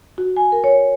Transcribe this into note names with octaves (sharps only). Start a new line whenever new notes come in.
F#4
G#5
A#4
C#5